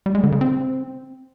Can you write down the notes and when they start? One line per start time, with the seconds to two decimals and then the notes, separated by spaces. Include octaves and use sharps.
0.06 G3
0.15 G#3
0.23 D3
0.32 C#3
0.41 C4